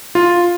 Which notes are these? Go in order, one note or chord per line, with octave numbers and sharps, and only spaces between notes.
F4